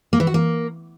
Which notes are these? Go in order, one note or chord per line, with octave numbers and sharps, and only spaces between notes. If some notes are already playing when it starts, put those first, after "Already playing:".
A#3
E3
F#4
A#3